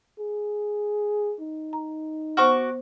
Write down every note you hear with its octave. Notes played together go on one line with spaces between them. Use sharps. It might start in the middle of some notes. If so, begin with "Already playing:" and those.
G#4
D#4
A#5
B3 F#4 C5 C#6 D6 F6